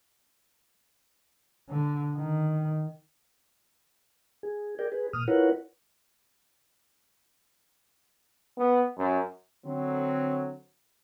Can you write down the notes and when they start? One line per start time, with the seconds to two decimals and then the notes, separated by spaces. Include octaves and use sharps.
1.69 D3
2.16 D#3
4.43 G#4
4.79 G#4 A#4 D5 G5
4.92 G#4 B4
5.13 A#2 D#6 F6
5.28 E4 F4 A#4 B4 C#5 F#5
8.57 B3
8.98 F#2
9.66 D3 F#3 C4